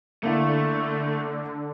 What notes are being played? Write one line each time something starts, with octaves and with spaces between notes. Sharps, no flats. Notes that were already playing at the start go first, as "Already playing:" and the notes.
D3 A3 A#3 E4 F5